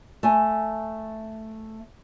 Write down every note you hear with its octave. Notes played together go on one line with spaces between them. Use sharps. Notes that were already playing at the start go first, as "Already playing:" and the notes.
A3 G#5